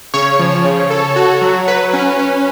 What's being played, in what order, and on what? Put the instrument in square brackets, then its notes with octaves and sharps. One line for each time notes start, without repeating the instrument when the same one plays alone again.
[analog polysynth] C#3 [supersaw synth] C#5
[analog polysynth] F3
C#3
A4
F#4
F#3
[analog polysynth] F#3 [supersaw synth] B4
[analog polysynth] C#4
C#4